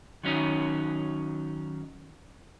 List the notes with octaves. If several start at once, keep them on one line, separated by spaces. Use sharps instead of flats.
D#3 F#3 C#4 D#4